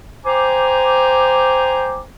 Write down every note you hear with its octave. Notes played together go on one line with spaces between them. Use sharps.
C5 G5 G#5 A#5 D6